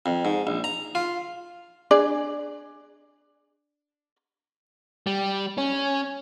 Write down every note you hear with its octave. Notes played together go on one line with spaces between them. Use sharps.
F2
G#2
A#1
A#5
F4
D4 G#4 D5
G3
C#4